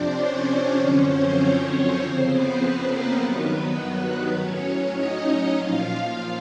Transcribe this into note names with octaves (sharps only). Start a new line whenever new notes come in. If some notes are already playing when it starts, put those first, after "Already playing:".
Already playing: F2 C3 F3 C4 D4 C5 D5
C#4 C#5
F#2 D3 F3 C#4 C#5
C4 C5
C4 C5
F2 C#3 F3
B3 B4
A#3 A#4
G2 D#3 F#3 B3 B4
B3 B4
A2 F#3 C#4 C#5
D#4 D#5
A#2 F3 F4 F5